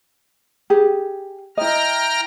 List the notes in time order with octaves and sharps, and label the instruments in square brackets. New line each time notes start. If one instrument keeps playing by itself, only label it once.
[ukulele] G4 G#4
[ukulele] E4 D#5 [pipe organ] G5 A#5 F6